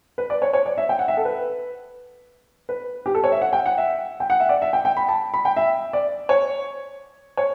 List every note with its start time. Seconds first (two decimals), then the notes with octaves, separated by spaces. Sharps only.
0.18 B4
0.30 D5
0.42 C#5
0.53 C#5
0.66 D5
0.78 E5
0.89 G5
0.99 F#5
1.08 E5
1.17 A4
1.25 B4
2.69 B4
3.06 G4
3.15 A4
3.24 C#5
3.32 E5
3.41 F#5
3.53 G5
3.66 F#5
3.78 E5
4.20 G5
4.30 F#5
4.40 E5
4.49 D5
4.62 E5
4.73 G5
4.85 G5
4.97 B5
5.09 A5
5.34 B5
5.45 G5
5.57 E5
5.93 D5
6.29 C#5
7.37 C#5